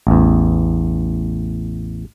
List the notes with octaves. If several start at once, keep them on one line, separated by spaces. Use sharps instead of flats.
A1 E2